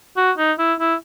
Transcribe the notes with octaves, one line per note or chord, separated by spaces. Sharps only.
F#4
D#4
E4
E4